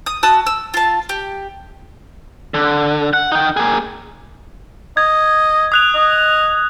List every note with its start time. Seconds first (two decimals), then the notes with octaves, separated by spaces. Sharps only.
0.06 D#6
0.23 F#4 A5 D#6 E6
0.46 E6
0.74 F4 A5
1.09 G4
2.54 D3
3.13 F#5
3.32 D#4 G5
3.57 A#3 G#4
4.97 D#5 G#6
5.72 D#6 F#6 F7
5.95 D#5